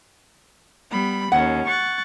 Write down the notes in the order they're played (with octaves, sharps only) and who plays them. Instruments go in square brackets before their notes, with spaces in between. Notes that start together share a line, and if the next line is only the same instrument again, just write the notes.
[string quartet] G3 B3 B5
[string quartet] D#2 C#4 [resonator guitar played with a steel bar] F#5
[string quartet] C#6 F#6 A6